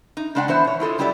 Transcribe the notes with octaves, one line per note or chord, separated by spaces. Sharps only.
D#4
C#3 G#3 D4 D5 F#5 G5
E3 B3 C5 E5
B2 C#5
E4 F4 A4 D#5
F#3 G3 E4 G4 A#4 D5